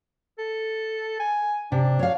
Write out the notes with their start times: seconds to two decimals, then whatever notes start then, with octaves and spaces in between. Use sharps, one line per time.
0.39 A4
1.20 G#5
1.72 C3 D4
1.99 C#5 F5